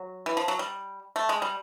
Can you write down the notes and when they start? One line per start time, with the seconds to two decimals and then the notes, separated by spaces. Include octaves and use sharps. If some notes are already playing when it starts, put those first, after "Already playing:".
Already playing: F#3
0.26 E3
0.37 F3
0.48 F#3
0.59 G3
1.16 A3
1.29 G#3
1.42 G3